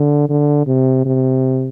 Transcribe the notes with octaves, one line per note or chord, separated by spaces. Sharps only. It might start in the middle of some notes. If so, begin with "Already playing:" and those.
Already playing: D3
D3
C3
C3